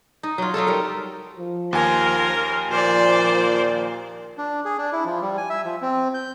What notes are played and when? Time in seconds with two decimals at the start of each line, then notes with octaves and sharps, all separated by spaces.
0.23 D#4
0.38 F#3 F4
0.54 F#3 D#4 F4 A4
0.67 G3 A#4
1.39 F3
1.73 D#2 A#4 G#5 C6
2.72 A#2 F3 C5 D5
4.38 D4
4.65 G#4
4.78 D4
4.93 E4
5.05 F3
5.22 G3
5.37 G#5
5.50 E5
5.64 F3
5.82 C4
6.14 G6